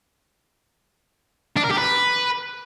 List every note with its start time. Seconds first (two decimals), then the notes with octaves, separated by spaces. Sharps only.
1.57 D4
1.64 A#4
1.71 G4
1.78 B4